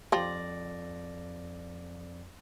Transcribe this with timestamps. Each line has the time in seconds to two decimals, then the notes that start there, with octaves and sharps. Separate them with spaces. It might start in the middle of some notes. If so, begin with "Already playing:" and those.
0.12 F2 F3 G4 D5 A#6